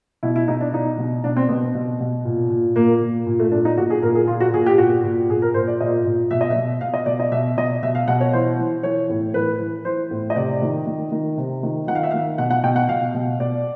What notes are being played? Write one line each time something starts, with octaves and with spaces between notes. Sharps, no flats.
B2 E4
E4
B2 D#4
D4
B2 D#4
B2
B2 D4
C4
B2 B3
B2
B2
A#2
A#2
A#2 A#3
A#2
A#2
A3
A#2 D4
D#4
A#2 F#4
G#4
A#2 A#4
G#4
A#2 F4
F#4
A#2 G#4
G4
A#2 F#4
A#2
A#2 G#4
A#4
A#2 C5
D5
A#2 D#5
A#2
B2 E5
D#5
E5
B2
B2 F5
D#5
B2 D5
D#5
B2 E5
B2 D#5
B2 E5
F5
B2 F#5
C#5
E3 C5
E3
E3 C#5
A2
E3 B4
E3
E3 C5
A2
D#5
C3 D5
D#3
D#3
D#3
C3
D#3
D#3 F#5
F5
E5
D#3 F5
B2 F#5
F#5
B2 G5
F#5
B2 F5
B2
B2 D5